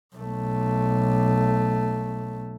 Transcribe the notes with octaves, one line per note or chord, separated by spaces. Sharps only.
B1 A3